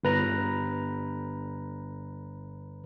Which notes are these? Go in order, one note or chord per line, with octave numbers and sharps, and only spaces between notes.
G1 B4 A#5